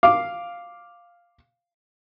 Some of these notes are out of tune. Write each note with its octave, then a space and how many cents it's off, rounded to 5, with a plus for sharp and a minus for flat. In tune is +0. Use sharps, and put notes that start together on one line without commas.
F5 +0 D6 +0